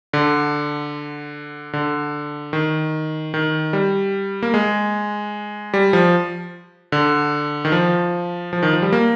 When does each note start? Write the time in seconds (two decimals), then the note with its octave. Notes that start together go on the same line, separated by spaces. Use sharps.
0.13 D3
1.73 D3
2.53 D#3
3.34 D#3
3.73 G3
4.42 A#3
4.54 G#3
5.74 G3
5.93 F3
6.92 D3
7.65 D#3
7.72 F3
8.53 F3
8.63 D#3
8.73 F3
8.82 G3
8.92 A#3